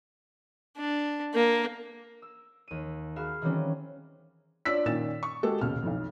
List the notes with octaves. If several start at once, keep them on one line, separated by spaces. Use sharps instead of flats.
D4
A#3
E6
D#2 D#7
F#4 G#4 F5 B5 F6 E7
D#3 E3 F#3 G3 C4 C#4
D4 F4 C#5 D5 E6 B6
A#2 D#3 C#4 A6 E7
C#6
G#3 F#4 G4 A4
D#1 C#2 B2 F6
B1 F2